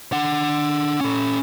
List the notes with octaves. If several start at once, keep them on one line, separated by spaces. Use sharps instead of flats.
D4 F#5
C#4 A4